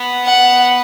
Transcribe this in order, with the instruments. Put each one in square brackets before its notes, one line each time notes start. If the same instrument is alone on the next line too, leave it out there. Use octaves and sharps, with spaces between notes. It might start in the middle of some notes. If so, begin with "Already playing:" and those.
Already playing: [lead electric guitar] B3
[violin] F#5